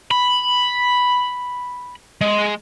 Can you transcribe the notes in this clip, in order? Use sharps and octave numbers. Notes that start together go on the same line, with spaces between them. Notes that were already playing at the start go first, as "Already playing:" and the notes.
B5
G#3